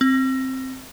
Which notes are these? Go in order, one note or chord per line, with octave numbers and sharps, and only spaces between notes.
C4